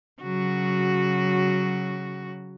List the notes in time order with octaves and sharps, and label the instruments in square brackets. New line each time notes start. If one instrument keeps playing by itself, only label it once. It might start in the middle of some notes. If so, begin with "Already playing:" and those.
[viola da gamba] C#3 F#3 F#4